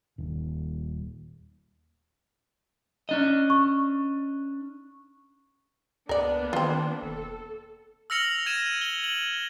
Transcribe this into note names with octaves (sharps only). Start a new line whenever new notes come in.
D#1
C#4 D4 D#5
C#6
C#2 A#3 B3 D4 A#4 D5
D#3 C4 F4
E1 A4
E6 F6 A#6 C#7 F7 F#7
G#6 A#6 D#7 E7
G7
F#7